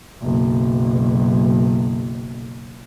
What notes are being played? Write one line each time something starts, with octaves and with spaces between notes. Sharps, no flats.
F#1 B1